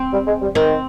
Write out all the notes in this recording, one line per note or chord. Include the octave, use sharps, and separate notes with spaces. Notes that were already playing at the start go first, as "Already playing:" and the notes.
Already playing: C4
G3
G#3
G3
D#3 C4